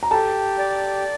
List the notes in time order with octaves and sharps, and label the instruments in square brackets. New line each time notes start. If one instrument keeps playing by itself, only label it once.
[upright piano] A#5
[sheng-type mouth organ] G4 [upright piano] A4 A5
[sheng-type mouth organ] D5